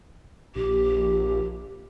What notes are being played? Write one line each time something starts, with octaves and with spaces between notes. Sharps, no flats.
A#1 G4